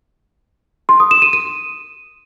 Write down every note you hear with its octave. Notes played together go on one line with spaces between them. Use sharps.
C6
D#6
E7
D#7
D#7